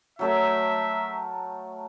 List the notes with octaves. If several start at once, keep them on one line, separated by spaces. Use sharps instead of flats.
F#3 A3 A#4 E5